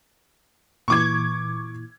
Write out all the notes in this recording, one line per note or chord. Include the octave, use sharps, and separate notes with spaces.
A#2 E3 C#6 D6 G#6